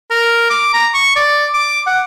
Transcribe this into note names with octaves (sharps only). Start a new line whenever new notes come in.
A#4
D6
A#5
C#6
D5
D6
F#5